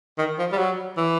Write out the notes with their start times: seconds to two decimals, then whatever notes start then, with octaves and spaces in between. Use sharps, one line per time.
0.18 D#3
0.39 F3
0.52 G3
0.58 F#3
0.97 E3